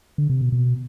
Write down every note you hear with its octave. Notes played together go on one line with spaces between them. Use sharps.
D3
C3
B2
B2